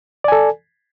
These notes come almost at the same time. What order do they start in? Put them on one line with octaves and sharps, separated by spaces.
D5 G#5 A4